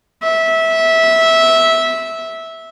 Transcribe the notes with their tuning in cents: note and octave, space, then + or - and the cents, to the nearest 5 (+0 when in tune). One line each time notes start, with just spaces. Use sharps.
E5 -15